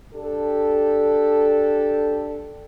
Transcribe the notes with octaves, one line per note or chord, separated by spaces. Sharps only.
D4 G4 A4